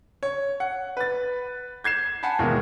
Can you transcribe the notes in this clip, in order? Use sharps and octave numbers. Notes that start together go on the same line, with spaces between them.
C#5
F#5
B4 A6
G6 G#6 C7 E7
F#5 G#5 A5 B5
D#2 B2 E3 G#3 A#3